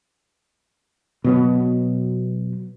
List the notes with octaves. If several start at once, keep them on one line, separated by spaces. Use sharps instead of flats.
B2 F#3 B3